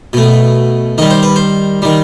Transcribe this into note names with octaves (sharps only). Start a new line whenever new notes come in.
B2 A3
D#3 G3 D#5
C5
B4
C5
D#3 G3